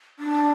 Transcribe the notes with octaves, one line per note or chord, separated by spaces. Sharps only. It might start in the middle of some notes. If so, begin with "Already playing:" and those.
D4